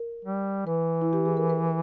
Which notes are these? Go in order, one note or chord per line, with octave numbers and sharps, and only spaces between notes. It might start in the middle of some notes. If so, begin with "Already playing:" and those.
Already playing: A#4
G3
E3 B4
E4
G4
G#4
A#4
B4